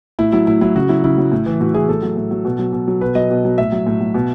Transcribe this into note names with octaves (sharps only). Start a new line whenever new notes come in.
A2 E4
F#3 E4
A2 E4
F#3 E4
C#3 F#4
F#3 E4
C#3 E4
F#3
A2
E3
A2 F#4
E3 G#4
A2 A4
F#3
A2
F#3
B2
F#3
B2
F#3
B2 B4
F#3 D#5
B2
F#3
A2 E5
F#3
A2
F#3
B2